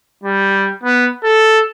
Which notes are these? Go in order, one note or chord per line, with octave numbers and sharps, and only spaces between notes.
G3
B3
A4